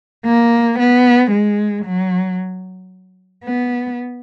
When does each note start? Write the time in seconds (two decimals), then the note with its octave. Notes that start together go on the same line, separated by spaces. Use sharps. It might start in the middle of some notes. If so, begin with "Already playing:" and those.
0.26 A#3
0.79 B3
1.31 G#3
1.85 F#3
3.45 B3